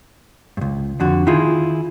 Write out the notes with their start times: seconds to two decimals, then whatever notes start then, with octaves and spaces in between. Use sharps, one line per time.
0.57 C#2 G2
1.00 F2 D3 F#4
1.27 D#3 E4 F4 G#4